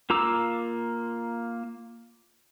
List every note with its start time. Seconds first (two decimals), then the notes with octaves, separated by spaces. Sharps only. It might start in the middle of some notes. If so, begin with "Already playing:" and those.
0.10 A#3 F4 A#5 D6 E6